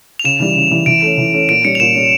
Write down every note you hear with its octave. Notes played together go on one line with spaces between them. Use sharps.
F7
C#3 E7
E3 G3
C#3
E3 G3
E3 D7
A3 C#4
E3
A3 C#4
A#2 D7
G3 C#4 C#7
F7
A#2 E7
G3 C#4